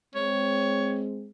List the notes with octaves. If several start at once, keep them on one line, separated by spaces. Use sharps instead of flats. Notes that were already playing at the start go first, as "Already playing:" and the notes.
G#3 C4 C#5